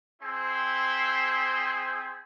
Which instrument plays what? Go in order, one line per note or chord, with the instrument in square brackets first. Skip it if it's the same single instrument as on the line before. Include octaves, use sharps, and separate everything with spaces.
[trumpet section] C4 E4 G#4 C5